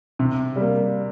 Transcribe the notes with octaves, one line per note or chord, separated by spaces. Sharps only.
C3
G3 A#3